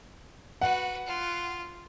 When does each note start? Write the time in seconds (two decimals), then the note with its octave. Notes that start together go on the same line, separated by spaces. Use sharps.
0.61 F#4 B4 F#5
1.06 F4